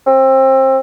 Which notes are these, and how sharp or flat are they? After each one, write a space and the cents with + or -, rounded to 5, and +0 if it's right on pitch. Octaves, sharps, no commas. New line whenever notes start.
C4 +25